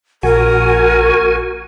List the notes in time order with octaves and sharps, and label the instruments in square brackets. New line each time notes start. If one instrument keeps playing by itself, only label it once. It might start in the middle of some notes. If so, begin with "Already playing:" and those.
[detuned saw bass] A#1 [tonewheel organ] F#4 G#5 [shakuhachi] A#4